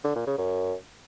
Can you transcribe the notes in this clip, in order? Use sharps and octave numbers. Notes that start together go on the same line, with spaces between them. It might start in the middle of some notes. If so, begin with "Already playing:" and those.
D3
A#2
C#3
F#2